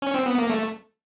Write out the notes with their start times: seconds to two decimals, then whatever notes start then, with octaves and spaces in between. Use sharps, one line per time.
0.02 C#4
0.14 C4
0.26 B3
0.38 A#3
0.50 A3